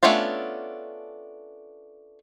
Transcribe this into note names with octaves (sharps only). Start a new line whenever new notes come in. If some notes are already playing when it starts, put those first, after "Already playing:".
A3 B3 C#4 D4 F4